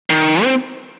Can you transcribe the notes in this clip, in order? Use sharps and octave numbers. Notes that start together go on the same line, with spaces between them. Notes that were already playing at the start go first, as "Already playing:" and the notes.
D#3
C4